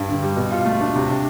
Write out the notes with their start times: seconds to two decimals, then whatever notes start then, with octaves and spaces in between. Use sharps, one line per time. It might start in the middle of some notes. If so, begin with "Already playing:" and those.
Already playing: G2
0.09 D3
0.23 G3
0.37 B2
0.51 F4
0.65 A3
0.81 D4
0.95 C3
1.10 D4